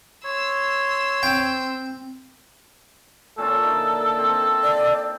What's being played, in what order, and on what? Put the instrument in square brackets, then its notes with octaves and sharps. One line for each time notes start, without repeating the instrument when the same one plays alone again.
[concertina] C#5 [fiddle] C6 E6
[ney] C4 [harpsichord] G5
[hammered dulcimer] A#2 C#4 F4 [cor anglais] A4
[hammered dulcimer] D3 D#4 E5
C4
[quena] D5